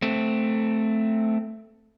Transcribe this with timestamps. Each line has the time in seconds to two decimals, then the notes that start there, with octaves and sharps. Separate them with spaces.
0.02 A3 C4